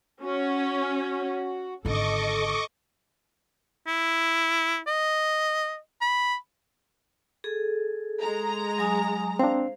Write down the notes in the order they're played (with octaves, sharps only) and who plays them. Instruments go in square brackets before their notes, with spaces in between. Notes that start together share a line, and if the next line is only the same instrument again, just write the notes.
[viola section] C#4 [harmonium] F#4
[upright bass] G#1 D3 [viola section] A4 [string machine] D#5 C#6 D6
[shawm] E4
D#5
B5
[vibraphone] G#4 A4
[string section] G#3 A#5
[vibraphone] F#3 G#5 D#6
[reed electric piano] C4 D4 [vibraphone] C5 F5